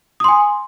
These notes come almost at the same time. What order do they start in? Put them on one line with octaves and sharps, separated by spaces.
D#6 C6 G#5